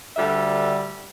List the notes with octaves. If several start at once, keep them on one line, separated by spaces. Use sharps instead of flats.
D2 D3 G3 A4 E5